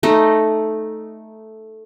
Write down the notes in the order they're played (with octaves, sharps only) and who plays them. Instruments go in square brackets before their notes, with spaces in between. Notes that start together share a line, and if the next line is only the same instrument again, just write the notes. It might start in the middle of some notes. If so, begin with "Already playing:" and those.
[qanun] A3 D#4